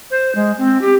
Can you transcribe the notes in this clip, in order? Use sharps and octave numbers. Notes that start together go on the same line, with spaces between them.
C5
G#3
C4
G4